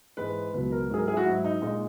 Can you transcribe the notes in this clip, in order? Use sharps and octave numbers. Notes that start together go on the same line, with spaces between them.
G#2 E3 G#3 B4
C#2 B2 F#3 B4
A#4
G#2 F#3 G#4
A#4
G#4
E4
F#4
G#2 F#3 E4
D#4
A#2 G#3 D#4